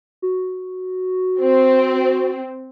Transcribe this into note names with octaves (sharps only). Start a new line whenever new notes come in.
F#4
C4